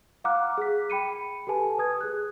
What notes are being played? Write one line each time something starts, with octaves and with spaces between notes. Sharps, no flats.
F5 F#5 A#5 D6 F6 F#6
G#4 B6
G5 B5 C#7 D#7
G4 A4 B4 G#5 A5
B4 D#6 G#6
G#4 F#6